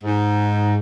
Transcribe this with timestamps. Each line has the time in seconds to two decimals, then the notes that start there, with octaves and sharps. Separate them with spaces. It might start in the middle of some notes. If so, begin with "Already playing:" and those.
0.04 G#2